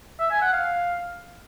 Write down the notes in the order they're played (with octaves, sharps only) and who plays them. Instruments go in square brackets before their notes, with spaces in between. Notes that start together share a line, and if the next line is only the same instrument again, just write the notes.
[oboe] E5
G#5
F#5
F5